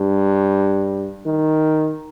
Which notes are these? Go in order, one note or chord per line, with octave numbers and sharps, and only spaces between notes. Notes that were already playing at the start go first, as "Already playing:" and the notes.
Already playing: G2
D#3